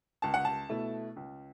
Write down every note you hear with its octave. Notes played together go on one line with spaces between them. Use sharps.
C#2 A5
F#5
A5
B2 A3 E4
C#2